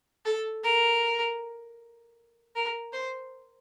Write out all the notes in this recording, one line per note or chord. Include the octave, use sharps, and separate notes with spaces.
A4
A#4
A#4
C5